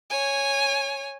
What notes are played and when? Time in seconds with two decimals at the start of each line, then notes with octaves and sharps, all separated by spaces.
0.10 C#5 G#5